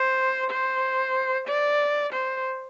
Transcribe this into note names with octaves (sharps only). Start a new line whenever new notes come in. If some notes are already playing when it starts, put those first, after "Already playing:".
Already playing: C5
C5
D5
C5